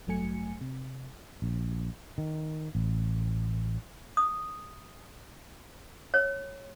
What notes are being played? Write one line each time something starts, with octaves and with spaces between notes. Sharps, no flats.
A1 G2 F#3 A3 G#5 C#7
C3
A#1
D#3
A1
D#6
C#5